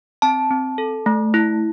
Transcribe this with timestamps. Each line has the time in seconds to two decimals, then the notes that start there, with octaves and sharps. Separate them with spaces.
0.22 C4 A5
0.51 C4
0.78 A4
1.06 A3
1.34 E4